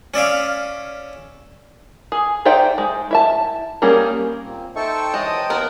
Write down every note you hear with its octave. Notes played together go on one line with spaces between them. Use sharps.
C#4 D5 E5 F5
G#4
D#4 C5 D5 E5 G5
G#3
E4 E5 A5
G3 A#3 C#4 G#4 A#4
A#2 A#3 C4
D#4 A4 C5 E5 G5 A5 C#6
E3 F#3 G#3 D#5
D#2 B3 A#4